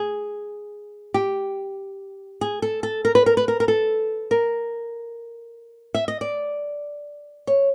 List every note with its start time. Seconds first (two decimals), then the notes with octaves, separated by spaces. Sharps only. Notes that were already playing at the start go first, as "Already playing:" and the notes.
Already playing: G#4
1.14 G4
2.41 G#4
2.62 A4
2.83 A4
3.05 A#4
3.15 B4
3.26 A#4
3.37 B4
3.48 A#4
3.60 A#4
3.68 A4
4.31 A#4
5.95 E5
6.08 D#5
6.21 D5
7.47 C#5